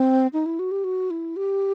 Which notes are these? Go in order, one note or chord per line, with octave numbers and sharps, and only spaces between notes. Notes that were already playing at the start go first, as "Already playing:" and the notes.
Already playing: C4
D#4
E4
F#4
G4
F#4
E4
G4